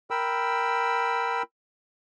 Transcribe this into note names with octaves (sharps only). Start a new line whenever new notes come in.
A#4 G5 B5 E6